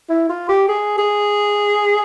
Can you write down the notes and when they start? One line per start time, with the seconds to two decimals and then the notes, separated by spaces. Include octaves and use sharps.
0.09 E4
0.29 F4
0.48 G4
0.68 G#4
0.98 G#4